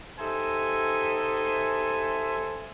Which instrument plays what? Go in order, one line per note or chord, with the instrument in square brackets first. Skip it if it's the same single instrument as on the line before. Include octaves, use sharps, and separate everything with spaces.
[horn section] D#4 G4 A4 C5 E5 G#5